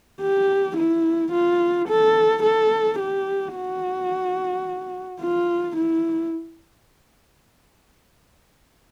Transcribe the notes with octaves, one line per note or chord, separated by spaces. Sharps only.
G4
E4
F4
A4
A4
G4
F#4
F4
E4